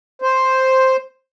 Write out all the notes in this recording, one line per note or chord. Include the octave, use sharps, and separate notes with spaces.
C5